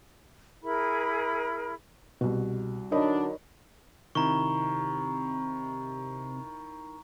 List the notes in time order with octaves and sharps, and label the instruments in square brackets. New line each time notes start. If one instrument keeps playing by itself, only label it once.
[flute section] E4 G#4 A#4 B5
[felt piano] C2 F#4 [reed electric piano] B2
[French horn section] D3 F#3 D4 [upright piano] D#4 [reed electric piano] A#4 [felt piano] C#5 D5 B5
[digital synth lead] C3 [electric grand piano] D#3 E4 [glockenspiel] A#5 C#6